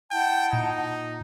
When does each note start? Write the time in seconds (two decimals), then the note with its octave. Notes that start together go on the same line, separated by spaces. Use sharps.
0.11 E4 F#5 G5 A5
0.53 A#2 D#4